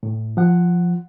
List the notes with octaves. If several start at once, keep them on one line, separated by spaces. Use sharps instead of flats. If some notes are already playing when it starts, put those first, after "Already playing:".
A2
F3 F#5